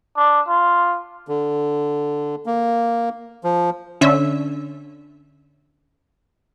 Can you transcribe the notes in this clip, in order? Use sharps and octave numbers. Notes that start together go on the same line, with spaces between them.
D4
F4
D3
A#3
F3
D3 C#4 E5